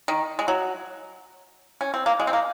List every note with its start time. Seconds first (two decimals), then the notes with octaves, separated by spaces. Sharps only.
0.08 D#3
0.39 G#3
0.48 F#3
1.81 C#4
1.94 C4
2.06 A#3
2.20 G#3
2.27 C4
2.33 A#3